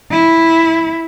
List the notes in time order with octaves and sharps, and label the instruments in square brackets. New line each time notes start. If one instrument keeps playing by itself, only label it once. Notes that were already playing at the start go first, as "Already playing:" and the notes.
[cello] E4